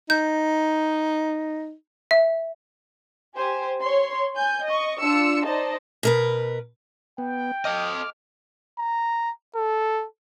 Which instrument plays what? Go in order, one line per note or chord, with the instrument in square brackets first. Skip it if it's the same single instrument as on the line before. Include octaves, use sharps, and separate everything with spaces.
[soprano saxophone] D#4 [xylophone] G6
[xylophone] E5
[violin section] G4 C5 G#5
C#5 C6
G#5 G6
D#5 C#6
D4 F4 E6 C#7
D#4 C5 D5 D#5 A5
[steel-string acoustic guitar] B2 A#4 B4
[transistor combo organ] B3 [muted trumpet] G5
[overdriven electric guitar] A4 D#5 [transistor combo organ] D6 F6
[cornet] A#5
A4